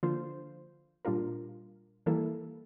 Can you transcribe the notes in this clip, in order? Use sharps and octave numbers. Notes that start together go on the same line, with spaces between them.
D3 F3 A#3 F4 C5
A#2 G3 D4 F4 A#4
E3 G3 A#3 E4 A4